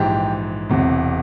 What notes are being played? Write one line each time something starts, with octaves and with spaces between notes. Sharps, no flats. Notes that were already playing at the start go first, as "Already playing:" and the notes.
Already playing: A#1 G#2 E3 G4
E1 E2 C3